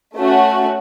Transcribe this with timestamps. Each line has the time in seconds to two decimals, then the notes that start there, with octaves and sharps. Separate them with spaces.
0.17 A3 C#4 F#4